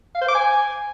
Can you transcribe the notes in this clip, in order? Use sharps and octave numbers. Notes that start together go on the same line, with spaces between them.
F5
C5
D6
G#5